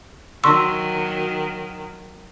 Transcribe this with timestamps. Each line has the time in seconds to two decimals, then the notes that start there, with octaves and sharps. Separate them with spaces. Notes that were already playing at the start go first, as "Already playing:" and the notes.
0.44 D#3 F#3 C6 C#6 E6